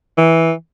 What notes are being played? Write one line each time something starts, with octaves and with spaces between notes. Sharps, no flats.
E3